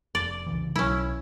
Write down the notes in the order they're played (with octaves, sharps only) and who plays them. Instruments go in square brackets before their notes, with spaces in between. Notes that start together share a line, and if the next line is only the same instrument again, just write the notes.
[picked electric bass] F1 [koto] D5
[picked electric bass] C2 C#3 E3
[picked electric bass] B1 F#3 [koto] C#4 E4